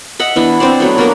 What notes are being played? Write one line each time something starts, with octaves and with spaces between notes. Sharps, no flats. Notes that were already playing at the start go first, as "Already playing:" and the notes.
D#5 E5 F#5
E3 B3 D4 E4
C4 D4 C5 D5
F#3 A3 B3
A#3 B3 D4 A#4